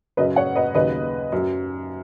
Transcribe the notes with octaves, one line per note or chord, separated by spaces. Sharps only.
F#2 C#3 F#3 B4 D#5
C#5 F#5
B4 D#5
D#2 C#3 F#3 B4 D#5
F#2 F#3